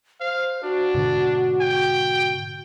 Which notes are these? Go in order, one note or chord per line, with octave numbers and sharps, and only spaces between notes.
C5 F5
D4 F#4
G#2 B2 D3
G5